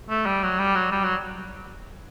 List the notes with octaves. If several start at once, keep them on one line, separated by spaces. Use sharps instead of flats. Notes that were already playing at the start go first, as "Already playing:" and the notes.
A3
G3
F#3
G3
F#3
G3
F#3